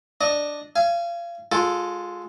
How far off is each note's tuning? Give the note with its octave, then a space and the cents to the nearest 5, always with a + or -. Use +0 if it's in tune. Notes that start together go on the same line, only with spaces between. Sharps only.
D4 +0 D#5 -5
F5 -30 G#5 +10
G#3 +0 F4 +25 A4 +0